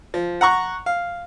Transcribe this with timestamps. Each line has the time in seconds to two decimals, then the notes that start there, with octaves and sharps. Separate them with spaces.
0.14 F3
0.41 F#5 A#5 C#6
0.86 F5